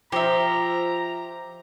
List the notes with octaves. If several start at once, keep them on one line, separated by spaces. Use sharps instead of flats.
F3 G4 E5 A#5